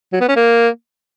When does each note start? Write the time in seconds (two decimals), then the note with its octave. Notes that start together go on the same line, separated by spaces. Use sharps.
0.13 F#3
0.21 B3
0.28 C#4
0.36 A#3